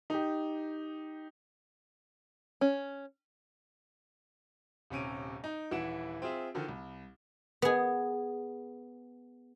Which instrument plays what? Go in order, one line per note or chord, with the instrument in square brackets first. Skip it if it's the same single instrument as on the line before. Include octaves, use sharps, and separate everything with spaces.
[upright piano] D#4 G4
[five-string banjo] C#4
[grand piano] D#1 C3 C#4 D7 D#7
D#4
D#1 E3 E4 F#5 D7 E7
C4 F4 G#4 E5
D3 D#3 F3
C2
[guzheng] B3 G#4